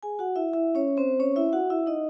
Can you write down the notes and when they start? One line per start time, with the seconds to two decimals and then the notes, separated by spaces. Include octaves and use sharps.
0.03 G#4 G#5
0.19 F#4 F#5
0.36 E4 E5
0.53 E4 E5
0.75 C#4 C#5
0.97 C4 C5
1.20 C#4 C#5
1.36 E4 E5
1.53 F#4 F#5
1.70 E4 E5
1.87 D#4 D#5